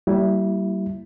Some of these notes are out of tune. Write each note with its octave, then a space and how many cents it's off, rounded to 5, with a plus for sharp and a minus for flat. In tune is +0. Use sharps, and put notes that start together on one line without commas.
G3 -30 A#3 -15 E4 +0